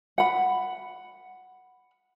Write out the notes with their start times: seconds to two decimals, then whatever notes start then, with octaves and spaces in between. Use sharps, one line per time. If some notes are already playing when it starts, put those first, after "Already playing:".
0.18 F#5 B5